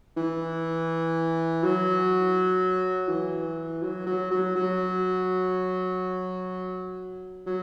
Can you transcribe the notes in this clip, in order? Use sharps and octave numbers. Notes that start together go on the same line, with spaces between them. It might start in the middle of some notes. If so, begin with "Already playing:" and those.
E3
F#3
E3
F#3
F#3
F#3
F#3
F#3